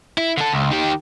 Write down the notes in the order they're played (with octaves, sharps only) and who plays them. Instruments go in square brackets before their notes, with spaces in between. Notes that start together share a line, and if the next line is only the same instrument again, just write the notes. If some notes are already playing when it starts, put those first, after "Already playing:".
[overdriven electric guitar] E4
D3 A4
C#2
D#3 G4